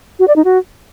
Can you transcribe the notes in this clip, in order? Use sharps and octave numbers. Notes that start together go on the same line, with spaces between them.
F#4
D5
D#4
F#4